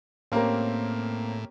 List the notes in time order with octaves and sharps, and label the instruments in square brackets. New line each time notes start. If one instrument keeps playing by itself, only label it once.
[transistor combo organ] A2 [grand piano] A#3 C4 [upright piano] C#4 G4 A#4